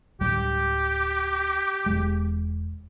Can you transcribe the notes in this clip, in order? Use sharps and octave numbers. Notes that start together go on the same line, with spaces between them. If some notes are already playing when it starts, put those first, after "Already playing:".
D1 G3 G4
E1 G#3